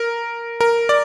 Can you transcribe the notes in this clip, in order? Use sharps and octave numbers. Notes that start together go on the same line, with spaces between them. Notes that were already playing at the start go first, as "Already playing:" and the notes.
Already playing: A#4
A#4
D5